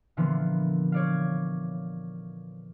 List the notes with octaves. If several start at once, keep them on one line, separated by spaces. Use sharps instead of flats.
A#2 D3 E3 F3 A#3 B3
C#5 D5 F5